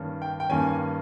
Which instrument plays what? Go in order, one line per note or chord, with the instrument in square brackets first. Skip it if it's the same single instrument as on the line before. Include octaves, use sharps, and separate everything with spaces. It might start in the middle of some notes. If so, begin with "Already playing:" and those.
Already playing: [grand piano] G2 D#3 A#3 C#4
G5
G5
G2 D#3 A#3 C#4 G#5